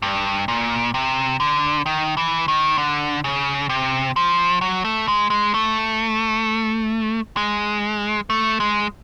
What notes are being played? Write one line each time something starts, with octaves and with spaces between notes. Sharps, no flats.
G2
A#2
C3
D3
D#3
E3
D#3
D3
C#3
C3
F3
F#3
A3
G#3
G#3
A3
G#3
A3
G#3